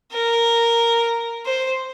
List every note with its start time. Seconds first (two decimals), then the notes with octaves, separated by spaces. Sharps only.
0.13 A#4
1.45 C5